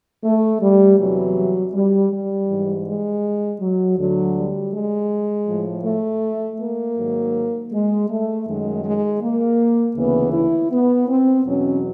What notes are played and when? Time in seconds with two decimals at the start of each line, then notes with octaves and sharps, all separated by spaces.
0.24 A3
0.62 G3
0.99 E2 C3 E3 F#3
1.74 G3
2.11 G3
2.48 G#2 E3
2.86 G#3
3.60 F#3
3.98 D2 D3 F#3
4.36 G3
4.73 G#3
5.48 A2 F3
5.85 A3
6.60 A#3
6.97 G#2 D#3 F#3
7.72 G#3
8.09 A3
8.47 F#2 D#3 F#3 G#3
8.84 G#3
9.21 A#3
9.96 D2 C#3 E3 B3
10.34 E4
10.72 B3
11.08 C4
11.45 E2 B2 F#3 C#4